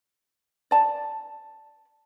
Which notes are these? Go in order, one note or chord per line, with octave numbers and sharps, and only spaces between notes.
D5 A5